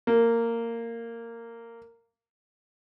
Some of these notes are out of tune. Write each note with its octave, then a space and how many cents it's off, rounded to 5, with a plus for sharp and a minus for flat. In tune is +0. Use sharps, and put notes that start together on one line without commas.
A#3 -15